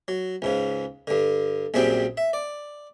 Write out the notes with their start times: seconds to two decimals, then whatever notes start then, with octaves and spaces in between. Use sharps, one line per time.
0.08 F#3
0.42 C#2 G#2 C#3
1.07 G2 D3
1.74 A#1 F#2 G3 C4 G#4 G5
2.17 E5
2.33 D5